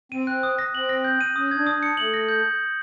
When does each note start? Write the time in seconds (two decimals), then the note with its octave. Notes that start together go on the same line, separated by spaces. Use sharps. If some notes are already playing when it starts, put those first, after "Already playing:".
0.12 C4 D#7
0.27 F#6
0.43 D#6
0.59 A#6
0.74 C4 F#7
0.89 A#6
1.04 G6
1.21 D#7
1.36 C#4 D#6
1.51 D4 G#6
1.67 D#6
1.77 D4
1.83 C#7
1.97 A3 F#7
2.14 A#6
2.29 G6